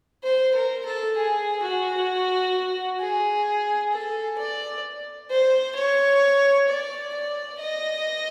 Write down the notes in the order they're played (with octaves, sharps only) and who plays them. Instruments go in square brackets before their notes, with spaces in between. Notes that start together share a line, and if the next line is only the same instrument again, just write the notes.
[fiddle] C5
A#4
A4
G#4
F#4
G#4
A4
D5
C5
C#5
D5
D5
D#5